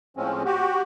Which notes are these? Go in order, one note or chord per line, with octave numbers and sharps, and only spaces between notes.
A2 F3 G#3 C4 C#4
F#4 G4